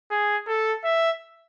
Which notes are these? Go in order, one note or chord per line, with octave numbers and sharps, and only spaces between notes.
G#4
A4
E5